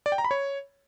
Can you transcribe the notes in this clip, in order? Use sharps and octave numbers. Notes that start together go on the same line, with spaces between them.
D5
G5
A#5
B5
C#5